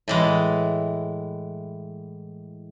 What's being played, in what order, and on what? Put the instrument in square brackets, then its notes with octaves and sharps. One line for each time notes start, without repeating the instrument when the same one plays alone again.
[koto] A2 E3 G#3